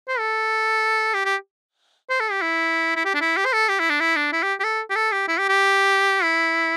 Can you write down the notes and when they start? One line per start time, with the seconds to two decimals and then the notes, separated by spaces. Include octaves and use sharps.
0.08 C5
0.19 A4
1.14 G4
1.25 G4
2.10 C5
2.20 A4
2.31 G4
2.42 E4
2.96 E4
3.05 G4
3.15 D4
3.21 E4
3.37 G4
3.45 C5
3.53 A4
3.69 G4
3.80 E4
3.90 D4
4.00 E4
4.17 D4
4.33 E4
4.43 G4
4.60 G4
4.64 A4
4.90 G4
4.96 A4
5.12 G4
5.28 E4
5.38 G4
5.49 G4
6.23 E4